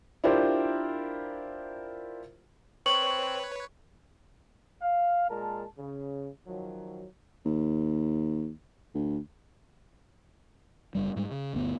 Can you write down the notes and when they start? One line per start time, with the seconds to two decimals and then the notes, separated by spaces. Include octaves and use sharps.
0.24 D4 E4 F4 G4 A#4 C5
2.86 C4 B4 C#5 C#6 F#7
4.82 F5
5.30 A#2 G#3 A#4 A5
5.78 C#3
6.47 D#3 F3 F#3
7.46 D#2
8.95 D2
10.95 F#1 G2 G3
11.16 G#2 G3 G#3
11.31 C#3
11.53 G1 D2 G2 B3